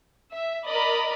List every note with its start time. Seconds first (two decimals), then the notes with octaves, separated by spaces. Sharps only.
0.32 E5
0.66 A#4 D5 D#5 B5